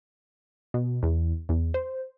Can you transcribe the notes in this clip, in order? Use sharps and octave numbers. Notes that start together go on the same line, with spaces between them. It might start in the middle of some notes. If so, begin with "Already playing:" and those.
B2
E2
E2
C5